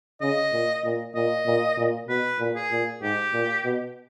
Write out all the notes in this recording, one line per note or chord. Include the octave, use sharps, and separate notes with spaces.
C#3 D#5
A#2
A#2
A#2 D#5
A#2
A#2
B2 B4
A#2
G#4
A#2
G#2 G4
A#2
B2